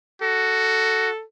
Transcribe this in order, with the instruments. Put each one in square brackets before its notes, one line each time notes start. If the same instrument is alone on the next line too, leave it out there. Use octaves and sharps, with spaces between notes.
[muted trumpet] F#4 [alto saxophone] A4